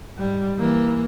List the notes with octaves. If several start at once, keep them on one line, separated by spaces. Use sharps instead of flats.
G#2 G3
E3 A#3